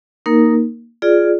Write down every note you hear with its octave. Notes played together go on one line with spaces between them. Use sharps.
A#3 D#4 A#4
F4 G#4 D5